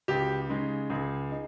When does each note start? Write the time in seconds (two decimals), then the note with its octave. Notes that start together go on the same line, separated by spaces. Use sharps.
0.08 C#2 G4
0.49 C#3 G#3 D#4
0.90 C#2 G#4
1.31 D#4